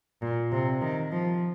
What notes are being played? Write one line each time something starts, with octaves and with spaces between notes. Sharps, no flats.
A#2
C3
D#3
F3